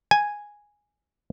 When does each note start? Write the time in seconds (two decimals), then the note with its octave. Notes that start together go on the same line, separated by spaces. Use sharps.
0.11 G#5